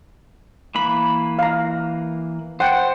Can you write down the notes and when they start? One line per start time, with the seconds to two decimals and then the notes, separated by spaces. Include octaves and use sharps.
0.75 E3 A#3 B5
1.39 F5 A#5
2.60 C5 F#5 G5